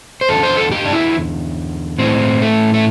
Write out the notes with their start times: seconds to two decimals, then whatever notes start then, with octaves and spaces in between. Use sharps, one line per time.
0.21 C5
0.29 E2 D3 A4
0.43 C5
0.57 A4
0.71 G4
0.85 D4
0.93 E4
1.99 A2 E3 C4
2.41 A3
2.74 A3